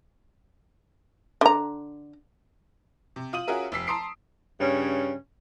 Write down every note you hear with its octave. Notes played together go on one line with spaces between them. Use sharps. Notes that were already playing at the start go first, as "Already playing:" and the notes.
D3 A#5
C3
F4 D#6 D#7 F#7
C#4 F4 F#4 G#4 A#4 E5
F1 E6 B6 C7
A5 A#5 C6 D#6 C7 D7
G2 C#3 C#4